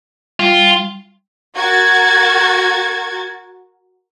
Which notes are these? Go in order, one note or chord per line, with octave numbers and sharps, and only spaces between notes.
G3 F4
F#4 A#4 G#6 A6